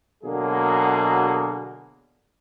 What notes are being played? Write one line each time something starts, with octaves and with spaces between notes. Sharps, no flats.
B2 D3 F#3 A#3 G#4